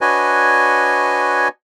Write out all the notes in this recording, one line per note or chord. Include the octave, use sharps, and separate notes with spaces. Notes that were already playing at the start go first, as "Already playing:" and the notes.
D4 F#4 B4 C#5 D#5 G#5